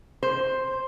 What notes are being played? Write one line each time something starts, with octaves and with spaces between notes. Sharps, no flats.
C5